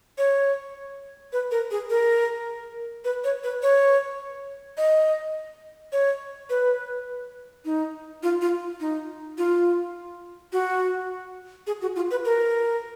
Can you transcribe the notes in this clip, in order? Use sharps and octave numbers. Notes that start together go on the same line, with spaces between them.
C#5
B4
A#4
G#4
A#4
B4
C#5
B4
C#5
D#5
C#5
B4
D#4
F4
F4
D#4
F4
F#4
G#4
F#4
F4
B4
A#4